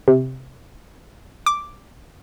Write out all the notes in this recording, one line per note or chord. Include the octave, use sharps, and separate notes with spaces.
C3
D6